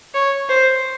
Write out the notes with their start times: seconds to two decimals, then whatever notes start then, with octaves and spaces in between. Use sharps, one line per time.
0.14 C#5
0.49 C5